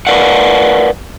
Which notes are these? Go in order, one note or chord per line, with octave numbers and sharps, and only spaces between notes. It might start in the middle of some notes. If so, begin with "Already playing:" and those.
A#4 B4 D5 F5 F#5